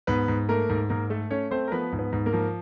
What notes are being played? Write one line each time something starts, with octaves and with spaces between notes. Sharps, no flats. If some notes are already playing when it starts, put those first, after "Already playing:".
G#2 B3 B4
G#2
A3 A#3 A#4
G#2
G#2 A#3 A#4
A3 A4
A3 C#4 C#5
A3 C4 C5
A#4
F3 B3 B4
G#2
B3 B4
G#2
A#3 A#4
F3